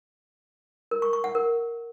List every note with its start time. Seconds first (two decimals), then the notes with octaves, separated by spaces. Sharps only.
0.91 A#4
1.02 C#6
1.13 C#6
1.24 F#5
1.35 A#4